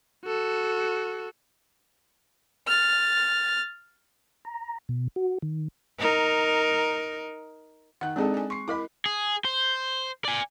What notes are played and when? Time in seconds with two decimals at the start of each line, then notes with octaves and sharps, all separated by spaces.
0.25 F#4 A4
2.67 F6 A6
4.45 A#5
4.89 B2
5.16 F#4
5.42 D#3
5.99 D#4 A#4
8.01 D#3 F#5 F#6
8.16 G#3 C4 D4 D#4 G#4 A4
8.34 G#5 A5
8.50 C6 C#6 C7
8.68 E4 A#4 D#5 B5 D6
9.06 G#4
9.45 C5
10.25 D5 G#5